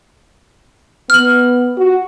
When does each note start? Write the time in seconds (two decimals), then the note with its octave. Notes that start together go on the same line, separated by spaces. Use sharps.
1.10 B3 F6 F#7
1.77 F#4